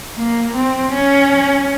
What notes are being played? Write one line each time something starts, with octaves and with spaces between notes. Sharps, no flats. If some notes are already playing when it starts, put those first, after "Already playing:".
A#3
C4
C#4